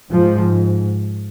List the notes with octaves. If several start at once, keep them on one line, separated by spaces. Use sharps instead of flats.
G#2 F3